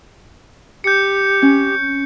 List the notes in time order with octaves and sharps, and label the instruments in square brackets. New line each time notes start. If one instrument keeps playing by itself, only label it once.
[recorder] G4 [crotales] G6 C#7
[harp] C#4